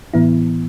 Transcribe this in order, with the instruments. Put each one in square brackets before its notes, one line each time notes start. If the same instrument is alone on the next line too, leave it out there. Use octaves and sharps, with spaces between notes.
[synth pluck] A2 E3 B3 E4